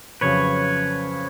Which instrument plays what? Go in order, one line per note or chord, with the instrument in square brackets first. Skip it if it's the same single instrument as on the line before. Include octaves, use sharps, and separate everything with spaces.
[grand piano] F2 C#3 F#3 [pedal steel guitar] B4 C#5